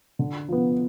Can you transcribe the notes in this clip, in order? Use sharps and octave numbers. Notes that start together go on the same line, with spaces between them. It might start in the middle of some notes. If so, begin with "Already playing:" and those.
D3
F3 B3